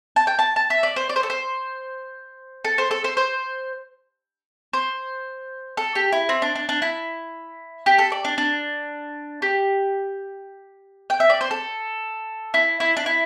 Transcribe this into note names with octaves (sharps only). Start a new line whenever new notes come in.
A5
G5
A5
A5
E5
D5
C5
D5
C5
A4
C5
A4
C5
A4
C5
C5
C5
A4
G4
E4
C4
D4
D4
D4
E4
G4
A4
D5
D4
D4
G4
G5
E5
D5
C5
A4
E4
E4
D4
E4